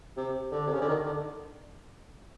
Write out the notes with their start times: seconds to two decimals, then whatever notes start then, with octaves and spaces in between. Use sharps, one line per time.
0.17 C3
0.51 D3
0.67 C3
0.73 C#3
0.81 D3
0.88 D#3
1.06 D3